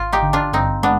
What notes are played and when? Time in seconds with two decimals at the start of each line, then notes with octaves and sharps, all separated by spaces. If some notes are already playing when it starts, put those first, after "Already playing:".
Already playing: G#1 F4
0.12 D#4 G4
0.23 D3
0.33 D4 F4
0.53 G2 C4 D#4
0.83 G#3 B3 D4